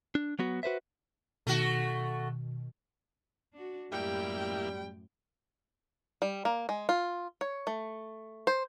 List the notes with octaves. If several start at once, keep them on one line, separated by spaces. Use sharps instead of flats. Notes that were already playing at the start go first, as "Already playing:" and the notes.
D4
F#3 B3 F#4
F#4 B4 C5 E5
B2 D#3 A3 F#4
D4 F#4
F#2 A2 G3 A#3 E4 G4 G5
G3
A#3
G#3
F4
C#5
A3
C5